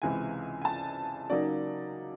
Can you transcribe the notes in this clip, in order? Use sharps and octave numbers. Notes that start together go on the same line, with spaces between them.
C#2 C3 E3 G#3 G#5
G#5
A5
C#3 F#3 A#3 D#4 D5